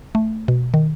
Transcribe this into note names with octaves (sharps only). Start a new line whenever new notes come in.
A3
B2
D#3